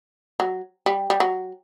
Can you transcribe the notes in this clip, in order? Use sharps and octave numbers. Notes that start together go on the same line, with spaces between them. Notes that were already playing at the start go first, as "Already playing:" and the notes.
F#3
G3
G3
F#3